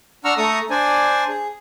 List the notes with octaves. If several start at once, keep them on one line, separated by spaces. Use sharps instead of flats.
D4 F#5 A#5 C#6 E6 F6
A3 A4 A#5 C#6 D#6
D4 C5 D5 G#5
G#4